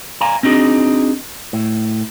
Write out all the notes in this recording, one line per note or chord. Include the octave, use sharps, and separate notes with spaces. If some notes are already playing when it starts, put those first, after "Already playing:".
F5 G#5 A#5
C4 D4 D#4 F#4 G#4
A2